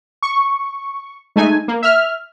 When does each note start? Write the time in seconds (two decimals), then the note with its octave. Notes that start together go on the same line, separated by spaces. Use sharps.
0.23 C#6
1.36 G#3 A3 D#4 G#5
1.68 A#3
1.83 E5 F6